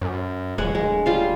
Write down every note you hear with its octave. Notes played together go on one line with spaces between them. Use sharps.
F#2
D#1 G#3 C#5 F#5
D1 G#3
G3 F4 F5